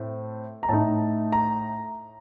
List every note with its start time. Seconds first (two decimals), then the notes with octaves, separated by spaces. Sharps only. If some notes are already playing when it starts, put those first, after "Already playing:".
Already playing: A2 A3 C4
0.63 A#5
0.69 A2 A3 D#4 A5
1.32 A#5